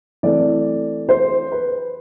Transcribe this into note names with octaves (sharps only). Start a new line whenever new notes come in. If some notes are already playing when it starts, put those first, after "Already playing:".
E3 A3 C4 D5
C5
B4